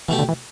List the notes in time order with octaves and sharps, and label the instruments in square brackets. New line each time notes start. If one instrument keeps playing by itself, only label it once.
[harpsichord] B2 A3 G4 [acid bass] E3
[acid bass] D3
E3